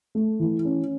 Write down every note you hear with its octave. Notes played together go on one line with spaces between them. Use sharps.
A3
E3
C#4